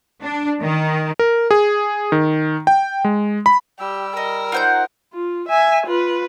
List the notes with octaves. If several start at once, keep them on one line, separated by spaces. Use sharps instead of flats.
D4
D#3
A#4
G#4
D#3
G5
G#3
B5
G3 G4 E6
A#4 D#5
D#4 F4 C5 F#5 G6
F4
E5 G#5
F4 B4